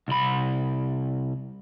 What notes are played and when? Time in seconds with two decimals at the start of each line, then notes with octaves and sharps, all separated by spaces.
0.08 C2 B5